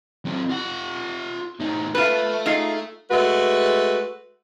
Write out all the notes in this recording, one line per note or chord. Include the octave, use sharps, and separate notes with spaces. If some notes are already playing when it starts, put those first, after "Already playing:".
F#3 C4
F4 F#5
A2 D#4
F4 A4 B4 E5
D#4 F4 G#4
G#3 A3 F#4 B4